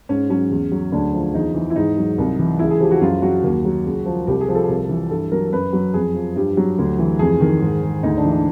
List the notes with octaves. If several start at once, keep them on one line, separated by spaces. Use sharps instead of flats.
G#2 C#4
F#3 C#4
E2
F#3
D2 D4
F3
E2 D#4
E3
E4
G#2 D#4
F#3
C2
E3
C#2 E4
G#4
F3 G4
F#4
F#2 F4
F#3 F#4
D#2
F#3
C#2
F3
C2 G4
G#4
F3
A4
C2
E3
G2 A4
F#3 A#4
F#2 B4
F#3
F2 G#4
F3
G2 G4
F#3
D2
E3
F2 G#4
D#3
G#2
G#2
D2 D#4
D4
E3
D4